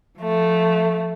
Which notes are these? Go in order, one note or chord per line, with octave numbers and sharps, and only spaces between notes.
F3 A3